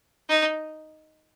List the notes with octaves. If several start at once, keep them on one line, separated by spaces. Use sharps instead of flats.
D#4